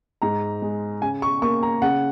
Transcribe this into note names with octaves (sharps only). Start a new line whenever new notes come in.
G#2 A#5
G#3
C#3 G#5
C#6
A#3 C#6
A#5
C#3 F#5